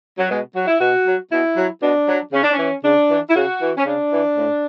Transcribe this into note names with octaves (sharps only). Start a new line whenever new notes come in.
F#3
B2 G#3
F#3 F#4
E4
B2 F#4
F#3
B2 E4
F#3
B2 D4
F#3
C#3 C#4
D4
C#4
E3
C#3 D4
E3
E4
C#3 F#4
E3
C#4
C#3 D4
E3
A2